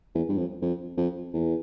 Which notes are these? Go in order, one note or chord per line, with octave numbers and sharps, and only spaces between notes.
E2
G2
F2
F2
F2
E2